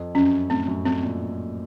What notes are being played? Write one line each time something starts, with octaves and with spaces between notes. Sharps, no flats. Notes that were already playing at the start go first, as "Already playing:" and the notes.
Already playing: F2
F#2 C#4
A2 C4
F#2
A2 C4
A#2